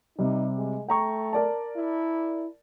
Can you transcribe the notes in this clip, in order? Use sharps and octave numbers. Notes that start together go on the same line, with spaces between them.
C3 G3 D#4
G#3
A3 G5 A#5 C#6
A#4 D5 A5
E4